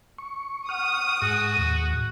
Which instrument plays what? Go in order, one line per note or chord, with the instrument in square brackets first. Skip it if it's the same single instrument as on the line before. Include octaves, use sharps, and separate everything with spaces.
[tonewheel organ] C#6
[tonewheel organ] F#5 C#6 F6 [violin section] D#6
[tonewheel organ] G#2 G#4 [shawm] F#4
[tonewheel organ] D#2 A2